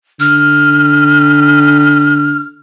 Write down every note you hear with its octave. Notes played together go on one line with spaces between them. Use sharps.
D3 F6